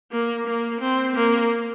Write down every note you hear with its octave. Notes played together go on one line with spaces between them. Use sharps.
A#3
A#3
C4
A#3